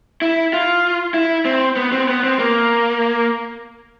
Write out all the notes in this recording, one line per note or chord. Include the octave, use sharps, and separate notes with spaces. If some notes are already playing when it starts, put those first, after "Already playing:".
E4
F4
E4
C4
B3
C4
B3
C4
A#3